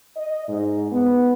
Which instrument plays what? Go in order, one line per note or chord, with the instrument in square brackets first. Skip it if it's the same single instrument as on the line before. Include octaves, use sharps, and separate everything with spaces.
[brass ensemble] D#5
G#2
B3